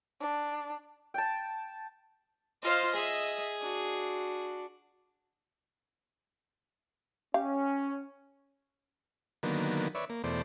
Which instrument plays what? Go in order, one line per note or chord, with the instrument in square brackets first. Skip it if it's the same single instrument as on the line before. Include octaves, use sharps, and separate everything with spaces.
[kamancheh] D4
[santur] G5 A5
[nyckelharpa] F4 F5 [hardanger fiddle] C5 D#5
[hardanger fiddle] G#4 [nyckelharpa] D#5 E5
[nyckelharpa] D4 F#4
[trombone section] C#4 [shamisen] G4 F5
[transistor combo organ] D3 D#3 F#3 A#3 B3
B4 C#5 D5 E5
A#3
E2 B2 A3 C5 D5